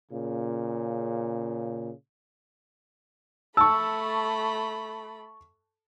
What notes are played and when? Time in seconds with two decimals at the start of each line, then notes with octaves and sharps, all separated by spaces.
0.11 A#2 C#3
3.57 A3 A5 B5 C#6 E6